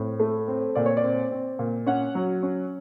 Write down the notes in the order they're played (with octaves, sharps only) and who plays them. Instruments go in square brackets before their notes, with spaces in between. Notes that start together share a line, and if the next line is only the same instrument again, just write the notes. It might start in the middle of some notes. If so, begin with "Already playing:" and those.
Already playing: [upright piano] A2 C4
A3
C4
A#2 D5
C#5
D5
C4
C4
A#2
C#4 F#5
F#3
C#4